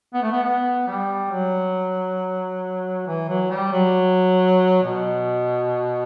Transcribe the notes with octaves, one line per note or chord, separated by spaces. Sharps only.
B3
A3
B3
B3
G3
F#3
E3
F#3
G3
F#3
B2